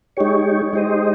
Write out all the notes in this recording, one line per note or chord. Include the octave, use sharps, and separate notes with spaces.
G#3 D#4 G4 C#5
G#3 D#4 G4 C5 D#5